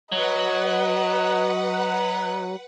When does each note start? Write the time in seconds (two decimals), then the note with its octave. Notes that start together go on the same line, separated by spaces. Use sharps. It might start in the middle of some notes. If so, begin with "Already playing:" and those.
0.12 F#3 B4 D#5 F#5